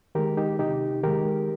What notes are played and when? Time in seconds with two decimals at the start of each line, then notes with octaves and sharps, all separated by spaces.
0.15 D#3 G#3 G4 A#4
0.37 D#4 G4
0.59 C3 D#4 G4
1.03 D#3 G#3 G4 A#4